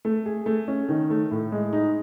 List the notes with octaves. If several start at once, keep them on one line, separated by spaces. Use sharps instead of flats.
A3
G#4
A3
C#4
D#3
A3
A2
G#3
D#4